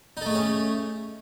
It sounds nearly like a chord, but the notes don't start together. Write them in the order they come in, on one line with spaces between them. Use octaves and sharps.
D#4 A4 A3 G#4 C#4